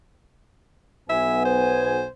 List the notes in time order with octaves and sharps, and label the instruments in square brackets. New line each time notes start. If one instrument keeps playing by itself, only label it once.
[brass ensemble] B1 B3 G#5 [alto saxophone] E5
[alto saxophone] C5